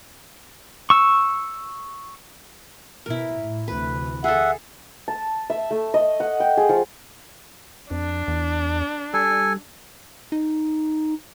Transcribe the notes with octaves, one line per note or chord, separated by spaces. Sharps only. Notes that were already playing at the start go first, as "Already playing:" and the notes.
C#6 E6
B2 E4 A#4
A2
D2 C3 E3 B4
G#4 A4 E5 F#5
A5
E5
A3
D#5
F#5
G5
G#4
F3
F2 D4
E2
G3 A4 G#5
D#4